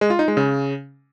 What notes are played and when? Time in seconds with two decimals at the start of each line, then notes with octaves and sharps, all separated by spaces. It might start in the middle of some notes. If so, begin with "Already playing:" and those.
0.01 G#3
0.10 F4
0.19 D#4
0.28 G#3
0.37 C#3